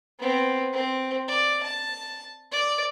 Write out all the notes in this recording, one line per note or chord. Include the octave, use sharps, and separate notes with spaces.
B3 C4
C4
D5
A5
D5